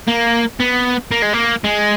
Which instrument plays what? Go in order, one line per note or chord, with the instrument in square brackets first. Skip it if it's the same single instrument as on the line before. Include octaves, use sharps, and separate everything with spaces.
[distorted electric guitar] A#3
B3
A#3
G#3
A#3
G#3